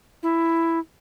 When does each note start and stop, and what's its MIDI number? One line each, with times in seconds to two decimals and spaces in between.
0.23 0.79 64